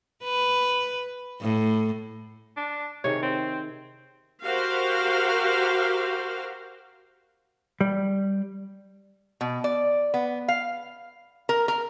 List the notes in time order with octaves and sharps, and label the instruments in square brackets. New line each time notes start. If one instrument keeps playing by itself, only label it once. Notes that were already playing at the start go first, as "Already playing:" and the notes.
[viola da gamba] B4
A2
[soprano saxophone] D4
[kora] C3 D#3 G#4 [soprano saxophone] C#5
[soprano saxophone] C4
[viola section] F#4 G4 A#4 C5 F5 G5
[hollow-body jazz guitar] G3
[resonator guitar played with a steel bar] B2
D5
B3
F5
A#4
A#4